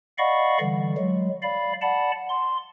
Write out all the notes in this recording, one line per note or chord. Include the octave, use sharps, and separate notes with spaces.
D5 D#5 F5 F#5 B5 C#6
D3 E3 G3
F#3 G#3
D5 F5 B5
D5 F#5 A5 B5
C6